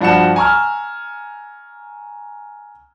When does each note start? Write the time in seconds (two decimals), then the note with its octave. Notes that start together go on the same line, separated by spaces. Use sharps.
0.01 G2 F3 G3 F#4 C#7 E7
0.36 G#5 A#5 C#6 E6 F6